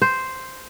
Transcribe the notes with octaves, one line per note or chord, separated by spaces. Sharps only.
C5